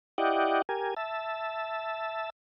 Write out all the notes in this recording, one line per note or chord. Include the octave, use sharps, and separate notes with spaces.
E4 G4 D5 D#5 F#5 G5
G4 A#4 G#5
E5 A5